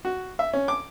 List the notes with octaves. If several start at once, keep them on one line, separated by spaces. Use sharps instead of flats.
F#4
E5
C#4
D6